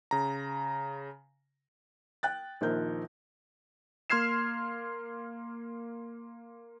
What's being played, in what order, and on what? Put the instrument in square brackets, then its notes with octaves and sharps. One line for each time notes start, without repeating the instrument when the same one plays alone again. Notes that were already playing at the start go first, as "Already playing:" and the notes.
[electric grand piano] C#3 A#5
[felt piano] G5 F#6 A6
A#1 D#3 F3 A#4 G6
[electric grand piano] A#3 C6 F6 G#6 C7 E7